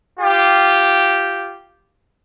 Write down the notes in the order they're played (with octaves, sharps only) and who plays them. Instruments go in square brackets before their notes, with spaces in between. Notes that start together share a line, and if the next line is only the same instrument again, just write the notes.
[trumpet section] F4 G4